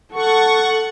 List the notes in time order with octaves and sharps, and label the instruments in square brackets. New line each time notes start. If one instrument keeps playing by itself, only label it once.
[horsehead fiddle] A4 [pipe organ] F#5 C#6